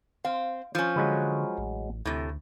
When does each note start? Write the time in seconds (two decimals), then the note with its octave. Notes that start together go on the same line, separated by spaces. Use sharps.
0.25 C4 F5
0.75 F3 C#4
0.96 D3 F#3 G#3 B4
1.58 A1
2.05 D2 A2 C3